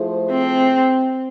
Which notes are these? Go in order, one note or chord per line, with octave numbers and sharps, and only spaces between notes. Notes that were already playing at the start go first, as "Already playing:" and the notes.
Already playing: F3 A3 E4 G#4 C5
C4